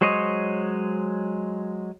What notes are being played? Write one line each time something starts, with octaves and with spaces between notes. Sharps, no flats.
F#3 G#3 C5 C#5 D#5